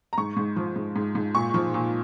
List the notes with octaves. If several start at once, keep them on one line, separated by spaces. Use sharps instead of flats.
A#5
G#2 C#6
G#2
F3
G#2
G#2
G#2
A#2 C#6
F3
A#2